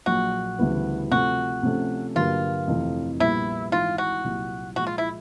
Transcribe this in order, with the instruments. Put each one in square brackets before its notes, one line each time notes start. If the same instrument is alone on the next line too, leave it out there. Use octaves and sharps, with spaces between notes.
[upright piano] A#1 A#2 F#3 [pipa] F#4
[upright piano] D2 C#3 E3 G3 B3
[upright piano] C3 F3 A3 [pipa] F#4
[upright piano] C3 F3 A3 C#4
[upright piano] G2 D3 F#3 A#3 [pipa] F4
[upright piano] F2 C3 E3 A3
[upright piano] A#1 A#2 G3 B3 [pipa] E4
[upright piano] G#1 G#2 E3 [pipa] F4
[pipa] F#4
[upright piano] C2 A#2 F#3
[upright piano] A#2 F3 G#3 [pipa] F#4
[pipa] F4
E4